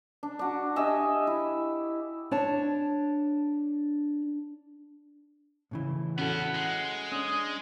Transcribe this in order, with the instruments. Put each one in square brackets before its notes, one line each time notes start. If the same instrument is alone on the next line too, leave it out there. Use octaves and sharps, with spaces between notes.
[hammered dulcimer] D4
D4 F#4
G4 D#5 E5 G#5
E4
[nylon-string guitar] D4 C#5 A5
[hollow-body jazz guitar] A2 C#3 E3
[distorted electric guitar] B3 E4 [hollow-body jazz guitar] C#4 F#4 A4 [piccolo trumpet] F#5
[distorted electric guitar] G#3
[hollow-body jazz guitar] C#4 D4 [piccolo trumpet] D#6